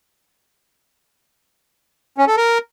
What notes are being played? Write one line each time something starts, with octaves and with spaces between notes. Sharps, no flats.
C#4
A4
A#4